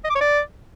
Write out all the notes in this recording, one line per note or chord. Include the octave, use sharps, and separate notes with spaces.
D#5
D6
C#5
D5